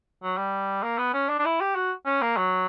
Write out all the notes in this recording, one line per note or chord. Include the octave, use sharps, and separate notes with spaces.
F#3
G3
A#3
B3
C#4
D4
D4
E4
G4
F#4
C#4
A#3
F#3